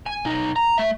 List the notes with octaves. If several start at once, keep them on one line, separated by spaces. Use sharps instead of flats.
G#5
B1 D#4
A#5
A3 E5